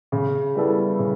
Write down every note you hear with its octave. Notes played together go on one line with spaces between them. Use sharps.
C#3
G3 B3 E4 A4
C#3